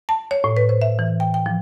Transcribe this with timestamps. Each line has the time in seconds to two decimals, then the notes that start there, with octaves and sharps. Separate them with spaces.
0.09 A5
0.31 C#5
0.44 A2
0.57 B4
0.69 C5
0.82 E5
0.99 E3
1.20 G5
1.34 G5
1.46 F3